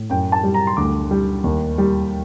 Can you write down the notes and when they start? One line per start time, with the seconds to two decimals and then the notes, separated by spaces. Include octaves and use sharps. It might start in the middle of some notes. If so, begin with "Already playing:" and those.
Already playing: A2
0.10 F#2 G5
0.32 A5
0.43 G3
0.54 A#5
0.67 C6
0.77 D2 D6
1.11 G3
1.44 D#2
1.78 G3